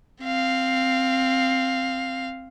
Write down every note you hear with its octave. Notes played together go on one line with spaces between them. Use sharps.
C4 F5